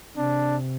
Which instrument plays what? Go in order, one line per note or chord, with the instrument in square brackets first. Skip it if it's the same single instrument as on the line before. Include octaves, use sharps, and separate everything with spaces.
[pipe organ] C3 [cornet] D4